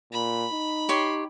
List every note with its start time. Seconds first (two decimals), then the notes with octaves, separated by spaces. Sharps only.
0.12 A#2 B5
0.53 D#4
0.89 G4 C#5 C6